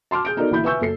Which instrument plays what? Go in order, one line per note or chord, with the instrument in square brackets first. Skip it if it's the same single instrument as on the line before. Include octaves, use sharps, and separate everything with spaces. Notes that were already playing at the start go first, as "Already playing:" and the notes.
[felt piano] A5 C6 D6 F6
G#4 G6 D7
B3 D#4 F#4 A4 A#4 D5
A#1 E3 E4 B5 G6
B4 E5 G#5 C#6 E6 G6
F#1 A4 C7